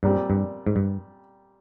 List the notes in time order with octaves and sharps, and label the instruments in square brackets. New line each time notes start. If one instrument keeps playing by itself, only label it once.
[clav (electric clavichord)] G2 [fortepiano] A#2 G3 C4
[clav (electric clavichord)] G2
G#2
G2